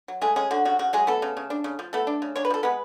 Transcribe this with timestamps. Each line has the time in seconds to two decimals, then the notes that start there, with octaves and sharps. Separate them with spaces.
0.08 F#3
0.21 G#3 A3 G#4
0.36 G#3 C#4 G#4
0.51 D3 F#4
0.65 C#3 F#4
0.79 C#3 F#4
0.93 F#3 G#3 G#4
1.07 A3 B3 A4
1.22 C#3
1.37 C#3
1.50 D4
1.64 C#3
1.79 F3
1.93 A3 B3 A4
2.07 D4
2.22 C#3
2.36 D4 C#5
2.45 B4
2.50 F3 A4
2.63 G#3 B3 B4